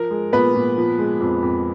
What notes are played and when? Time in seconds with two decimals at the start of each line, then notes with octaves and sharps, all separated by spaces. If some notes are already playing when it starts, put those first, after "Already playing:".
Already playing: F3 A#4
0.11 G#3
0.33 A#2 B3 B4
0.55 A#2
0.77 F3
0.99 G#3
1.21 F2
1.43 F2